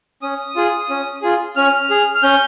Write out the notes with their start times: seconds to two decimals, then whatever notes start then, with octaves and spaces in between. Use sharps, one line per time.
0.22 C#4 D#6
0.56 F4 G#4
0.90 C#4
1.22 F4 G#4
1.56 C#4 F6
1.90 G#4
2.15 F6
2.23 C#4 G6